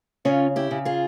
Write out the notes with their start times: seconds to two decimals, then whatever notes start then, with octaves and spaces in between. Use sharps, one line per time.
0.25 C#3 C#4 F4
0.56 E4 G4
0.71 C#3
0.85 F4 G#4